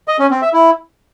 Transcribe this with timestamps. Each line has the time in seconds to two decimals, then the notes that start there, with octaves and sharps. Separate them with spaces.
0.08 D#5
0.19 C#4
0.31 C4
0.42 E5
0.53 E4